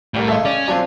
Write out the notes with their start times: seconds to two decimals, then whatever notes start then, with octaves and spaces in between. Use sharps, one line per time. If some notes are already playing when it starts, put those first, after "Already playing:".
0.14 C2 A2 G3 A#4
0.28 C#3 G#3 A4 E5
0.45 C#4 D5
0.68 F#3 C4 D4 F4